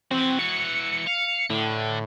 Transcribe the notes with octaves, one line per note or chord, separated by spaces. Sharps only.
E3 C4 F#4
C#7
F5
A2 D3